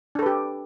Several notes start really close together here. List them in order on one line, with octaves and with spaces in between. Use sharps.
D4 A4 B4 G4